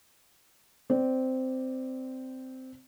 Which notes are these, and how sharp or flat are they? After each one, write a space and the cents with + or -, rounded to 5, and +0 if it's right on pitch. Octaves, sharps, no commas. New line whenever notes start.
C4 -10 D5 +0